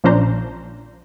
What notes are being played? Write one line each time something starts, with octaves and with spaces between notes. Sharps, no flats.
A#1 F3 C#4 D4 C5 A#5